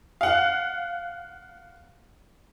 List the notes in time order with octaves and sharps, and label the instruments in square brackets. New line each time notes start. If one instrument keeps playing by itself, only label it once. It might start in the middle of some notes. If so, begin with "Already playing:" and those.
[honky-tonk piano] F5 F#5